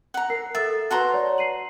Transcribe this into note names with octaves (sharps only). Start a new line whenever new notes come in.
F#5 A#5
A#4 C7
A4 E5 E6 A6
F#4 B4 A5 A#5 C6
C#5 D5
C7 D#7 F#7